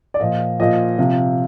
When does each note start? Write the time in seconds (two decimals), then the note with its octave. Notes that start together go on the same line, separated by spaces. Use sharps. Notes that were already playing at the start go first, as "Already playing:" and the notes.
0.14 D5
0.20 A#2 F3 D#5
0.60 A#2 F3 D#5
0.98 C3 F3